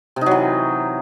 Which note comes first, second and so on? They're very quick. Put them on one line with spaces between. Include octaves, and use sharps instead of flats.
C3 D#4 F#3 E3